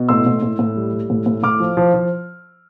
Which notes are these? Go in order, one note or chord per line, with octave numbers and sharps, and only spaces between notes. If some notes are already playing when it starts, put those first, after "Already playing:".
Already playing: B2
A2 C6 E6
A2
A2
A2
G3
G3
A2
A2
A2 D6 F6
F3
F3
F3